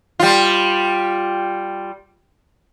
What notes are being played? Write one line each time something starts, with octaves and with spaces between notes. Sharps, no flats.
G3 F4